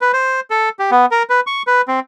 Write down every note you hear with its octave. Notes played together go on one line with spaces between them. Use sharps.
B4
C5
A4
G4
B3
A#4
B4
C#6
B4
C4